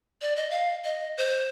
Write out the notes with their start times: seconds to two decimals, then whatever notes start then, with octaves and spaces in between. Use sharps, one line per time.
0.22 D5
0.36 D#5
0.51 F5
0.84 D#5
1.18 C5